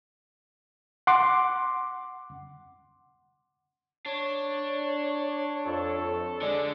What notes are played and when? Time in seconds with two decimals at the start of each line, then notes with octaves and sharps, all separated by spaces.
1.07 F#5 C6 D6
4.06 D4 C#5
5.66 F2 A4
6.41 D3 G#3 D4